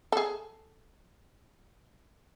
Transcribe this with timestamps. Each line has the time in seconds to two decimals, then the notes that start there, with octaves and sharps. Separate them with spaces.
0.12 G#4 A4